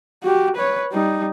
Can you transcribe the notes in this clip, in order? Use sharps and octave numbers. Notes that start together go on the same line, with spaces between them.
F#4 G4
B4 C#5
G3 D#4